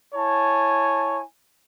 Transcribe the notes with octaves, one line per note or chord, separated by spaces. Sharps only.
E4 C#5 G#5 A5